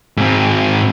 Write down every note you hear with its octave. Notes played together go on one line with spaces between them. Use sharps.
G#2 C4